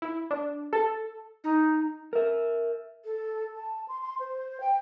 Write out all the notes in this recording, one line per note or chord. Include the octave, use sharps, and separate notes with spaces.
E4
D4
A4
D#4
A#4 E5
A4
A5
C6
C6
C5
G5